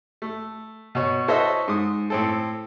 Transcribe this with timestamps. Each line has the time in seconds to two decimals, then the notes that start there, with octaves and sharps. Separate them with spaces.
0.22 A3
0.95 B2 C#5
1.28 F#4 A4 C5 C#5 D#5 E5
1.68 G#2 D#6
2.10 A2 C4 A4